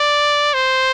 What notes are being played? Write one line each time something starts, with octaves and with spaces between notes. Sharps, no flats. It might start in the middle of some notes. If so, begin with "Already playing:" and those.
Already playing: D5
C5